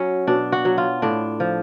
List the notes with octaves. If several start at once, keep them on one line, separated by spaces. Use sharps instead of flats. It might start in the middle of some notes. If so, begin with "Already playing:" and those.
Already playing: F#3 C#4
B2 D4
F#4
F#3
F4
A2 D4
F3